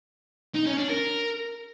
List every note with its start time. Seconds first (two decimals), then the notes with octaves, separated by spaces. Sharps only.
0.55 D#4
0.67 C#4
0.78 D4
0.90 A#4